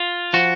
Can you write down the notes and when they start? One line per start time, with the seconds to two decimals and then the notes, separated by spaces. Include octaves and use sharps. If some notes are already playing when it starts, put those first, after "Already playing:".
Already playing: F4
0.33 F3 F#4